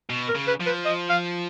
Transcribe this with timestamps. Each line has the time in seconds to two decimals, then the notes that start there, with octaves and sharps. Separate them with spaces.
0.10 B2
0.29 A#4
0.35 C#3
0.47 B4
0.60 F3
0.66 B4
0.85 D#5
1.09 F5